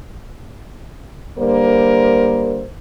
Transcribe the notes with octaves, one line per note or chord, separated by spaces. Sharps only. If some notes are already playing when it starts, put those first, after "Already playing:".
D3 G3 A#3 A#4 C5